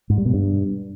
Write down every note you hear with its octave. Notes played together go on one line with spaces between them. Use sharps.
G#2
G3
B2
G2